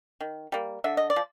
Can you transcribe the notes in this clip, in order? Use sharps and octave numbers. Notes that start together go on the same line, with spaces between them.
D#3
G3 A#3
D3 E5
D#5
D5
F3